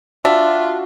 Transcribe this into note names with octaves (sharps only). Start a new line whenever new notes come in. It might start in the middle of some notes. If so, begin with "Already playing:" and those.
D4 F4 F#4 E5